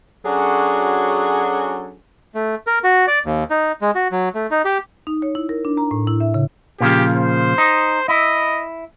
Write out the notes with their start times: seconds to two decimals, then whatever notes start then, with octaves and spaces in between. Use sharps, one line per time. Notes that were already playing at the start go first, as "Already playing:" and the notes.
0.25 F#3 C#4 D4 F#4 G#4 A4
2.35 A3
2.67 A#4
2.84 F#4
3.07 D5
3.25 D#2
3.50 D#4
3.81 G#3
3.95 F#4
4.12 F#3
4.35 A3
4.51 D#4
4.65 G4
5.07 D#4
5.22 C#5
5.35 E4
5.49 A#4
5.65 D4
5.77 A#5
5.91 A2
6.07 E4
6.20 E5
6.34 C#3
6.80 A#2 C#3 F3 G4
7.14 C5
7.58 D#4
8.08 E4 D#5